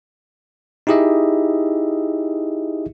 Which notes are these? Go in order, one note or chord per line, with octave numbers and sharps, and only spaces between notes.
D#4 E4 G4 G#4 D#5 E5